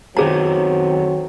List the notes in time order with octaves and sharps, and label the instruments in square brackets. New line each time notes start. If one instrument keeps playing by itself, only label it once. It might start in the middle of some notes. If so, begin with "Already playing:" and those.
[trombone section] F2 F#3 C4 [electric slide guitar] D#3 B3 [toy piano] G#4 A#5